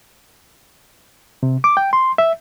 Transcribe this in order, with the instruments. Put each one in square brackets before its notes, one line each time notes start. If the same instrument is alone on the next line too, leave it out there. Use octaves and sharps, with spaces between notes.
[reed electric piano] C3
D6
G5
C6
E5